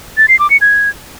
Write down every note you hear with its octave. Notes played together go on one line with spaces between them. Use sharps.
A6
C7
D6
C#7
G#6